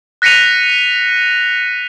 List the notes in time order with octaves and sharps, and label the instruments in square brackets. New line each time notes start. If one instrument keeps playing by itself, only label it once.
[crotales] F#6 A#6 B6 C#7 D#7 F7